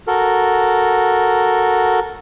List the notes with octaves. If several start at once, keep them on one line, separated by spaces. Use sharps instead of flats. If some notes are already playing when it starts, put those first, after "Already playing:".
F#4 A4 A#4